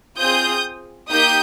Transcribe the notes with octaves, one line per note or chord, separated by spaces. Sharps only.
C4 F4 G#4 D#6 G6
A#3 D#4 G4 D#6 G6